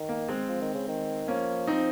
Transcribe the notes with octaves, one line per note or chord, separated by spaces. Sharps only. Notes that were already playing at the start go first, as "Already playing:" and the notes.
Already playing: D#3
A#3
G#3 C4
F3
D#3
C#3
D#3
F3 A#3 C#4
C4 D#4